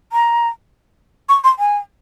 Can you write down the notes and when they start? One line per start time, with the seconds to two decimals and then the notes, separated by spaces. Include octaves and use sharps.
0.12 A#5
1.29 C#6
1.44 C6
1.59 G#5